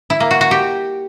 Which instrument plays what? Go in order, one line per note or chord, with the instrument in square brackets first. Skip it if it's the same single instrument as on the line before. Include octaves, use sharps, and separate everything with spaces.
[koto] E4
A#3
F#4
F#4
G4